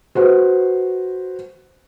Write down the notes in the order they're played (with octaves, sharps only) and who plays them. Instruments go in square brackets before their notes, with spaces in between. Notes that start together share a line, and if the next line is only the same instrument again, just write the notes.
[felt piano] F#4 B4 C5